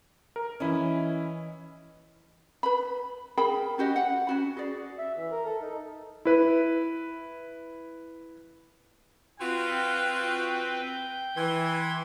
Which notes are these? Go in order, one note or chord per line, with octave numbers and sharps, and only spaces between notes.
A#4
E3 C#4 E4 D#5
B4 B5
G#4 A#4 G5 B5
C#4 F#4 G4 D#5
F#5
C#4 F#4 B5
F#4 G#4 D5
E5
E3
A#4
A4
D#4
E4 B4
C4 F4 F#4 B4 G5
E3 C6 G#6